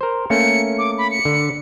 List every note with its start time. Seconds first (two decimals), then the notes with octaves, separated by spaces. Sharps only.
0.01 A#4 C5
0.30 A3 A#3 C#4 C#7
0.79 D6
0.98 B5
1.11 C#7
1.25 D3